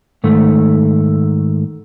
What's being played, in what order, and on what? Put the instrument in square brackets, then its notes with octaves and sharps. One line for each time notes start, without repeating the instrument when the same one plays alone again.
[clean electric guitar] G#2 D#3 A3